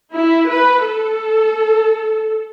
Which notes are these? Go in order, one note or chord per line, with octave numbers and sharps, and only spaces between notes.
E4
B4
A4